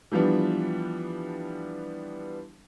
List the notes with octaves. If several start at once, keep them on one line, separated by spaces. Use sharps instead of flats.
E3 F3 G3 B3 D4